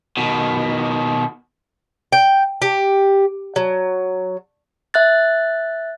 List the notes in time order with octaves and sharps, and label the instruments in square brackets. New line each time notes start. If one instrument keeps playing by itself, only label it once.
[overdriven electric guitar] B2 D#3
[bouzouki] G5
G4
F#3
[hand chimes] E5 F#6 A6